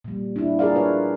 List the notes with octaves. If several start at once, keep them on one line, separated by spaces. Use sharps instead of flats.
A#2 G3
D4 E4
F4 G#4 A#4 D5 F5
D4 F4 B4 C#5